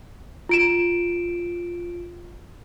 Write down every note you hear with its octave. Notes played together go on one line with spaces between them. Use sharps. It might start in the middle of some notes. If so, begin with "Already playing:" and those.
F4 D7 E7